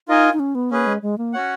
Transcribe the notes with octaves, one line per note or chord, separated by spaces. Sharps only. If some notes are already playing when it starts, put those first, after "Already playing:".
D#4 F4 A#4 D#5 G#5
D#4
C#4
B3
A#3 C#4 G#4 B4
G#3
G#3
A#3
C#4 F#4 C#5 F#5